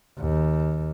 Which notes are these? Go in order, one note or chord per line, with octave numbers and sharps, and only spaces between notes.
D#2